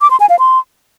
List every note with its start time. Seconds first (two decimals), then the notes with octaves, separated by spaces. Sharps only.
0.01 D6
0.11 C6
0.20 G#5
0.30 F5
0.39 C6